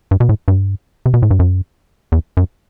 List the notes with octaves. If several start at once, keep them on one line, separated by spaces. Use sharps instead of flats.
G2
B2
A2
G2
C3
B2
A2
G2
F#2
E2
F#2